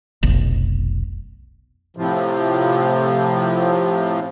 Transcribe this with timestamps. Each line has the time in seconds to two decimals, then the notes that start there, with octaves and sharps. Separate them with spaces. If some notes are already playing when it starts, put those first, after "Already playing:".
0.23 F1 B1
1.97 A2 C3 F3